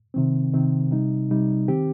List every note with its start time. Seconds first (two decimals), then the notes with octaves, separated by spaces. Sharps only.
0.14 C3 D#3 C4
0.54 C3 D#3 C4
0.91 C3 G3 D#4
1.31 C3 G3 D#4
1.68 D#3 C4 G4